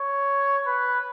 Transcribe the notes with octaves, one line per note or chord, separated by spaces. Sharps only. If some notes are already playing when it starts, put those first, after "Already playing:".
Already playing: C#5
B4